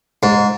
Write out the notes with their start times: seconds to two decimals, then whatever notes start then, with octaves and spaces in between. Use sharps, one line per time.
0.23 G#2